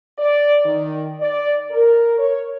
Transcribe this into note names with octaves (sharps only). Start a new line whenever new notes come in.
D5
D#3
D5
A#4
C#5